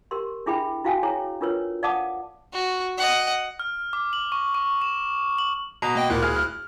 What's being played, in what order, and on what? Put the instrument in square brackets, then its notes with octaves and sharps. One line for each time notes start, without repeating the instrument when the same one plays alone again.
[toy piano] G4 A#4 C6
D4 E4 G#4 E5 G5 B5
E4 F#4 F5 G5 G#5
E4 G#4 C#5 G#5 A#5
D4 F4 A#4 B4 C#5
D5 F5 F#5 A5 D6 D#6
[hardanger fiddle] F#4
D#5 F#5
[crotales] F6
D6
F#7
C#6
C#6
E7
F#7
[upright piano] B2 [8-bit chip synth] A#5
[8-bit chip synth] A#3 D#5 G5
[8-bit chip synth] D2 E4 F#6 [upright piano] A#2
[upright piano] G#4 F6
F6